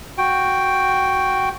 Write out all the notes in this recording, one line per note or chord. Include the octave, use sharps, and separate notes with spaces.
F#4 G5